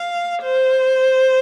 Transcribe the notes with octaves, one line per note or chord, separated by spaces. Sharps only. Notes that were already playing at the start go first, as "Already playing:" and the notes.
Already playing: F5
C5